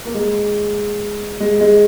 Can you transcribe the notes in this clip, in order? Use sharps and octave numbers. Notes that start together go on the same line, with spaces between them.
A#3
G#3
G#3
G#3